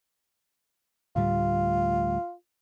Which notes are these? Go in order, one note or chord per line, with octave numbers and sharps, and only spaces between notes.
D2 A2 G3 F4